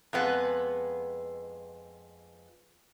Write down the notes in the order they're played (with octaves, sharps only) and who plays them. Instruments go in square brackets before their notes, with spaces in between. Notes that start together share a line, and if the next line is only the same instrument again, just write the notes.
[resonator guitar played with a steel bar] F2 G#3 B3